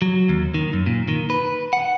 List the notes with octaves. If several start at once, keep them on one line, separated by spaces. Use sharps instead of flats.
F#3
D#2
D#3
F#2
A#2
D#3
B4
F#5